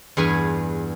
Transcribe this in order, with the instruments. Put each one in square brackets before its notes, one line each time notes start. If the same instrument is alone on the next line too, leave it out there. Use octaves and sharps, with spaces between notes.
[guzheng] E2 G2 G#4 B4 G#5